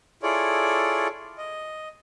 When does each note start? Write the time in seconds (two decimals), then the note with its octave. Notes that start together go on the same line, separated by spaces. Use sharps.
0.23 E4 F4 G#4 A4 C#5 D5
1.38 D#5